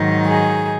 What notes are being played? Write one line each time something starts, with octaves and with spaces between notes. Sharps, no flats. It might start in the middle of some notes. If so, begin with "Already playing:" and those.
Already playing: G#2 D#3 F#3 D#4
G#4